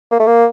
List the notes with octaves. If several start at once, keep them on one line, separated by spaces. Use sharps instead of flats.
A#3
A3
A#3